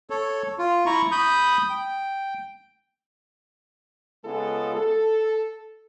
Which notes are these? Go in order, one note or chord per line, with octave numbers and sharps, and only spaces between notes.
A4 C#5
F4
E4 A#5 C#6
B5 D#6 G6
G5
C#3 G#3 B3 F4 G#4 A4
A4